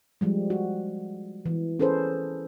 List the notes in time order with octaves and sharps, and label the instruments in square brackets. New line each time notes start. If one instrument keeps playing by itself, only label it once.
[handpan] F3 G3 G#3
F#4
E3
C#4 G#4 A4 B4 C5